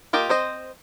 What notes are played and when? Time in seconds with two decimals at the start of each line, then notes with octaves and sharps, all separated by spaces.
0.13 A#3 F4 G4 D#5
0.29 C4 C5 D#5